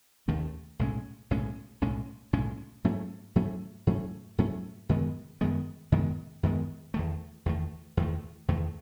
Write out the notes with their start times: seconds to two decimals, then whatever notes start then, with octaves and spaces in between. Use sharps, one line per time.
0.28 D#2 D#3 A3 C#4
0.79 B1 A2 G#3 C#4
1.31 B1 A2 G#3 C#4
1.81 B1 A2 G#3 C#4
2.33 B1 A2 G#3 C#4
2.84 G#2 F#3 A3 C#4
3.36 G#2 F#3 A3 C#4
3.87 G#2 F#3 A3 C#4
4.38 G#2 F#3 A3 C#4
4.89 F#2 D#3 G#3 B3
5.41 F#2 D#3 G#3 B3
5.92 F#2 D#3 G#3 B3
6.43 F#2 D#3 G#3 B3
6.94 E2 D#3 A3
7.46 E2 D#3 A3
7.97 E2 D#3 A3
8.48 E2 D#3 A3